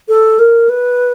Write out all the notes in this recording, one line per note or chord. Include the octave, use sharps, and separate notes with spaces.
A4
A#4
B4